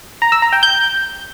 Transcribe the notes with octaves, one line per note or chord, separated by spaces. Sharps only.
A#5
E6
A#5
G5
G6